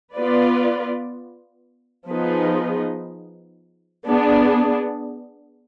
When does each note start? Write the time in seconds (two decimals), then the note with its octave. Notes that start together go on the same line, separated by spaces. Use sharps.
0.16 B3 F4 B4 D5
2.10 F3 B3 D#4 G#4 B4
4.06 B3 D4 G#4